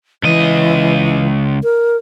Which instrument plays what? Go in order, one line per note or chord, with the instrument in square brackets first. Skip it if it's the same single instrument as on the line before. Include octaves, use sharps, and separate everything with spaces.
[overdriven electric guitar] C#2 D#5 [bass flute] E3
[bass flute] A#4